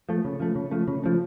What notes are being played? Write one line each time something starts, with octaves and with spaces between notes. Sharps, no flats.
F3 A3
C#3
F3 A3
C#3
F3 A3
C#3
F3 A3